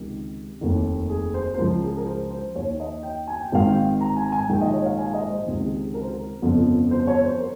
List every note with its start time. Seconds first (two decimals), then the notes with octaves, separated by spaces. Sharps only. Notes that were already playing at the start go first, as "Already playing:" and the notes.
Already playing: C#2 C3 D#3 G4
0.61 F1 D#2 D#3
1.09 G#4
1.34 C5
1.54 C5
1.57 C#2 C#3 F3 A#4
1.83 G#4
1.97 A#4
2.06 C5
2.30 C5
2.55 D#2 D#3 C#5
2.80 D#5
3.03 G5
3.28 G#5
3.42 G5
3.52 G#1 G#2 D#3 F5
3.68 G5
4.01 A#5
4.16 G#5
4.32 G#5
4.48 A#1 G#2 D#3 G5
4.61 D#5
4.73 C#5
4.86 F5
4.98 G#5
5.13 D#5
5.30 C5
5.46 C#2 C3 D#3
5.63 G#4
5.94 A#4
6.02 C5
6.11 A#4
6.42 G1 F2 C#3 F3
6.91 C5
7.07 C#5
7.24 C5
7.39 A#4